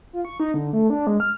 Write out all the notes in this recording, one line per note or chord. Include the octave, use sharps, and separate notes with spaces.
F4
C#6
D#4
D3
A3
D4
G#3
F6